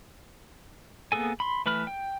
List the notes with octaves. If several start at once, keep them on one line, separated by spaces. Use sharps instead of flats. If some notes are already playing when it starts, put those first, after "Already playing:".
A#3 B3 G#4 A4 G#5
B5 C6
E3 A3 B4 B5 F6
G5